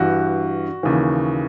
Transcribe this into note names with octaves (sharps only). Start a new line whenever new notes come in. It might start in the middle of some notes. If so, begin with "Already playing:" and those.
Already playing: G2 E3 F#4
D#2 C#3 E3